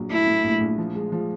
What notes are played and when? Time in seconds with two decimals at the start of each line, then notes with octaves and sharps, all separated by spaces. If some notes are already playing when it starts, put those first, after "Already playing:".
Already playing: A#1 F#3
0.10 A3 E4
0.27 A2
0.44 A#1
0.60 A#1
0.78 F3
0.95 G#3
1.12 F3